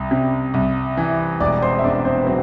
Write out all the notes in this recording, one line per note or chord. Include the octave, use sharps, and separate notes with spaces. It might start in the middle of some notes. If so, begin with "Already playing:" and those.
Already playing: C2
C3
C2
E3
E1 D5 D6
C5 C6
E5
E2 D4 D5
C4 C5
B4
F#3 C4 C5